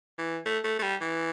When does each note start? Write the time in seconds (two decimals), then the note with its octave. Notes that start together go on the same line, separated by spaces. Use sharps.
0.19 E3
0.46 A3
0.64 A3
0.79 A3
0.83 G3
1.01 E3